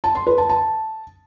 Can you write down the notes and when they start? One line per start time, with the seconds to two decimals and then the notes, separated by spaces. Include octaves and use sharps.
0.04 A5
0.15 C6
0.27 B4
0.38 A5
0.49 A5